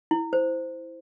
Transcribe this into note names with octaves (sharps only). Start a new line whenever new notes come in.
E4
C5